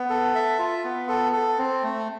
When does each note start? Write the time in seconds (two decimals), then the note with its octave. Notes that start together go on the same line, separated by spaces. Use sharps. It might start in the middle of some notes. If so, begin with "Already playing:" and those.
Already playing: B3
0.10 A4
0.35 E5
0.59 F4
0.84 B3
1.09 A4
1.33 A4
1.58 C4
1.83 A3